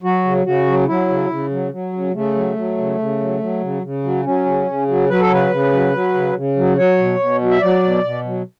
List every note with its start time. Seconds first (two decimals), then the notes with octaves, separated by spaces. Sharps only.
0.03 F#3 F#4
0.24 C#3
0.45 C#3 F#4
0.66 F#3
0.87 F#3 E4
1.08 C#3
1.30 C#3
1.50 F#3
1.72 F#3
1.93 C#3
2.14 C#3 A3
2.35 F#3
2.56 F#3
2.77 C#3
2.99 C#3
3.19 F#3
3.40 F#3
3.61 C#3
3.83 C#3
4.04 F#3
4.25 F#3 C#4
4.45 C#3
4.67 C#3
4.88 F#3
5.09 F#3 B4
5.20 A4
5.30 C#3 B4
5.51 C#3
5.73 F#3
5.93 F#3
6.14 C#3
6.35 C#3
6.56 F#3
6.78 F#3 C#5
6.98 B2
7.19 B2
7.41 F#3
7.50 E5
7.61 F#3 D5
7.83 B2
8.04 B2
8.25 F#3